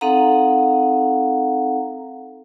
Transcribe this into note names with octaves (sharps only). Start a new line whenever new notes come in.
C4 D#4 A4 F5 F#5 A#5